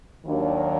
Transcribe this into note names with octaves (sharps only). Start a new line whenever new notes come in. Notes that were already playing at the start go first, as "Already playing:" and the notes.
D#2 D#3 F#3 A#3 D4